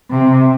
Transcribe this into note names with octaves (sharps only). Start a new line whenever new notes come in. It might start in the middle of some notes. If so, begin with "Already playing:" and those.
C3